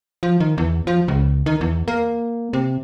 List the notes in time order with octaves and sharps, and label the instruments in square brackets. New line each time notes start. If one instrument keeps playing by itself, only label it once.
[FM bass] F3
D#3
E2
F3
C#2
D#3
E2
A#3
C3